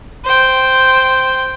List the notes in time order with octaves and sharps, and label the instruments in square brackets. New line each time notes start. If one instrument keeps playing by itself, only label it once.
[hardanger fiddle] C5 G5